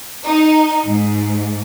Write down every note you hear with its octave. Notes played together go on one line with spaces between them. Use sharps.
D#4
G#2